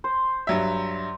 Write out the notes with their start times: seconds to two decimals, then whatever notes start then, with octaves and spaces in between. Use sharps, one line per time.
0.04 C5
0.47 G2 F#3 E5